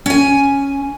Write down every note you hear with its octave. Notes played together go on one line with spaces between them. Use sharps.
C#4 G#5